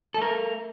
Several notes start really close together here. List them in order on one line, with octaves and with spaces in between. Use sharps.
A4 A3 A#4